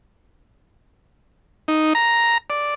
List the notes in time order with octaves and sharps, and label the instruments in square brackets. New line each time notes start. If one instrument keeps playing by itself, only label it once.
[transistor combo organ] D#4
A#5
D5